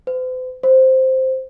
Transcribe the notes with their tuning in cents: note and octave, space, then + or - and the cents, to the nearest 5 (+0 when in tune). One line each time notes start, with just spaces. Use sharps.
C5 -45
C5 +0